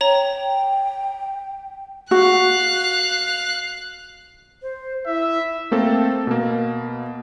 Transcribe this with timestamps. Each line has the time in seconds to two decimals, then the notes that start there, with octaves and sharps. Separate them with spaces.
0.01 C#5 G5 A#5
2.11 F#4 F5 F#6
4.62 C5
5.06 E4 E5
5.71 A3 A#3 C4 A4
6.27 B2 A#3